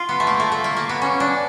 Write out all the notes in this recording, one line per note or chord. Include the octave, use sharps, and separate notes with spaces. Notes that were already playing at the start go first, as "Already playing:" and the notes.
Already playing: F4
B3
A3
A#3
A3
A3
A#3
A#3
B3
C#4
D4